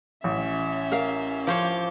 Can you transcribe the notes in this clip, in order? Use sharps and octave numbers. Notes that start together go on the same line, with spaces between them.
A1 C#4 E5
A#4 F5
F3 C5 C#5 D6 G6